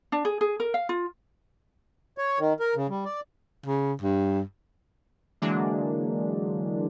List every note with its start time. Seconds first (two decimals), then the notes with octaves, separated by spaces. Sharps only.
0.12 D4
0.25 G#4
0.41 G#4
0.60 A#4
0.74 F5
0.89 F4
2.18 C#5
2.39 D#3
2.60 A#4
2.76 C#3
2.89 G3
3.05 D5
3.66 C#3
4.02 G2
5.42 D3 E3 F#3 G#3 A#3 D4